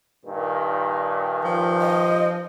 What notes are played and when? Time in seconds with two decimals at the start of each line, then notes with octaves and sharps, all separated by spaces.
0.25 G2 A#2 D#3
1.44 F3
1.81 D#5